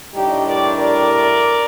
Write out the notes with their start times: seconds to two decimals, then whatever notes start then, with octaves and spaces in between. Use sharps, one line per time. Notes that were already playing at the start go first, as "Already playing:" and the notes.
0.13 A2 G3 D4 D#4 G4
0.45 A#4 D5
0.77 A#4 D5